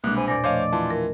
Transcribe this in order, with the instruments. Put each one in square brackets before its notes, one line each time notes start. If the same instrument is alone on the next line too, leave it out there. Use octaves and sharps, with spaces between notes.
[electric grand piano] C2 [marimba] B2 D4 [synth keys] G#3 A#3 [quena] F#6
[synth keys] C5 B5 [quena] G#5
[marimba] E2 A#2 A#6 [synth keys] C5 G#5 [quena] D5
[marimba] F3 A3 D#5 [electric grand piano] C5 C#5 F5 [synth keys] D6
[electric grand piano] E3 F4 [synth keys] A5 C6
[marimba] A#4